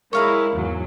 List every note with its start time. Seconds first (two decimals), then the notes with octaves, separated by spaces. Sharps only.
0.13 G#3 E4 A#4 C#5 F5 A#5
0.54 E2 G#2 F#3